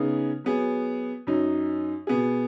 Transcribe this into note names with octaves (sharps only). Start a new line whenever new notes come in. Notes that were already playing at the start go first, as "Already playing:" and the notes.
Already playing: C#3 B3 D#4 G#4
F#3 B3 G#4
F#2 F#3 D#4
B2 B3 G#4